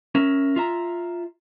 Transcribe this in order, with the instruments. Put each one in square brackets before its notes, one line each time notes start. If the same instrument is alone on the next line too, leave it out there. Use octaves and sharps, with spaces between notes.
[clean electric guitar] C#4 A#4 E5
F4 E5 A#5